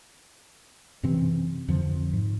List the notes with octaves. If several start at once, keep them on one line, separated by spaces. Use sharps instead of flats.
F#2 C3 E3 C4
F2 D3 F3
G#2